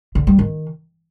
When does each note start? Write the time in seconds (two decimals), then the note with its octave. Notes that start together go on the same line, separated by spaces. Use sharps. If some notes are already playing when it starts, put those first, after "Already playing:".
0.15 D3
0.27 G3
0.39 D#3